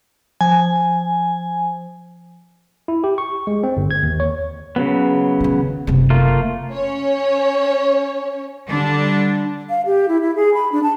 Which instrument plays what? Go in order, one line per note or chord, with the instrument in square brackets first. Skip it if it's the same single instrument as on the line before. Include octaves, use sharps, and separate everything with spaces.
[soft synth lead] F3 [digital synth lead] G#5
[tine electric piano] E4
G4
C#6
G#3
C4
G1
G#6
D#2
C#5
[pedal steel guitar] C#3 F#3 B3
[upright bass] D3 D#3
F#1 C3
[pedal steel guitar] A3 A#3 F4
[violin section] C#4 C#5
[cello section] D3 G3 D4
[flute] F5
G4
E4
E4
G#4
B5
D4
A5